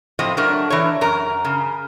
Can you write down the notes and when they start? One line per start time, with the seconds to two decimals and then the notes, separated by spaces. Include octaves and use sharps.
0.19 A2 F3 C4 D#5
0.37 F#3 A3 D4 A#4
0.70 E3 D4 C#5
1.01 F#2 A#4
1.45 C#3